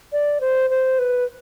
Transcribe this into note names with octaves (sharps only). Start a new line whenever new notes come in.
D5
C5
C5
B4